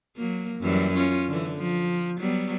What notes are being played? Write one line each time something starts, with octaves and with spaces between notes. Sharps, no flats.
F#3 A#3
F#2 E3 G3
C#4 F4
D3 E3
F3
F#3 G3 B3